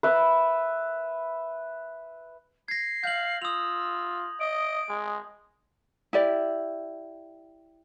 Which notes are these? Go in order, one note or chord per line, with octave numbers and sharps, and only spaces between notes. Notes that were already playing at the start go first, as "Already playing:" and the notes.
B4 E5
G#6 A#6 C7
F5 G6 F#7
F4 D#6 E6 F7
D#5 D7
G#3
E4 G4 D5